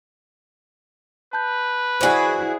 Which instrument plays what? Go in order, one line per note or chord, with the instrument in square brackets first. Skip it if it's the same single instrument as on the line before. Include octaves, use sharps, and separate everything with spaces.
[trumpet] B4 [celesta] A5 G6
[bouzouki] E3 F#4 [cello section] E4 G#4 [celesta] C5 D5 G#5